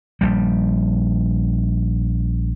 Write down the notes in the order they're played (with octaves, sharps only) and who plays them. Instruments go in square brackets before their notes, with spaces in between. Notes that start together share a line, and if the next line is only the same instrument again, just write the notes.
[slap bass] A#1 G3